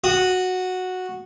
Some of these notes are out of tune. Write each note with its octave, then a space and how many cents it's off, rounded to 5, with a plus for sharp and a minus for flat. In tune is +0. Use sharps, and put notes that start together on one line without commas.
F#4 -5 D#6 +0